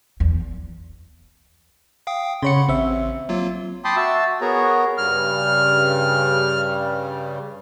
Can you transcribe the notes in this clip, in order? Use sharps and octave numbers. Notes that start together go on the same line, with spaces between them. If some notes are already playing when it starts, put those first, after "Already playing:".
E2
F5 G5 D#6
C#3 C#5 F#5 B5 C6 C#7
A1 C4 E5
F#3 A#3 F4
G5 A5 B5 C6 D6 D#6
F#4 E5 A5 E6
B3 F#4 G#4 A#4 C#5 A#5
G2 C#3 G3 F6